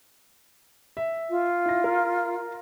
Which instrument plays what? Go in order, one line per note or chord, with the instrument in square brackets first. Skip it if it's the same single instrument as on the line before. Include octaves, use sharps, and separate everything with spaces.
[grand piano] E5
[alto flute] F4
[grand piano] E4 A#6
A#4